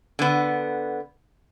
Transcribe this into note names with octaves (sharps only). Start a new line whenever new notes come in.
D3 B3